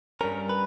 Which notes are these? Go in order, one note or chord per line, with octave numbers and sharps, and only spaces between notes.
G2 G3 C#4 A#4
B4